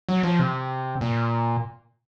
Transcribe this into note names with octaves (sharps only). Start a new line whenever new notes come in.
F#3
F3
C3
A#2